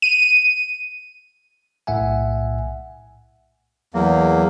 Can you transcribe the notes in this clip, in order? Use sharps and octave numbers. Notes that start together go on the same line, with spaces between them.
D#7
B1 A2 E5 F#5 G#5
E2 F#3 A#3